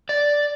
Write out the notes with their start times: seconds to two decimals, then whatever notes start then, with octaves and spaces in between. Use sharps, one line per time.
0.09 D5